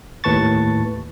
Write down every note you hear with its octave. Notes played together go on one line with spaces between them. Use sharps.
D#2 A2 B4 A5 C#6 A6